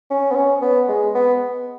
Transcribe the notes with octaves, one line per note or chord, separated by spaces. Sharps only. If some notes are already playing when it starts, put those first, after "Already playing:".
C#4
B3
C#4
B3
G#3
B3